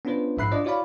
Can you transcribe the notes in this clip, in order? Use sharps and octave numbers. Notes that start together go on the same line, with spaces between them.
B3 C#4 D4 F4 B4 C5
A#1 G#2 E5 B5 F#6 C7
D4 F4 C5 D5 D#5
E4 F#4 C#5 D5 F5 B5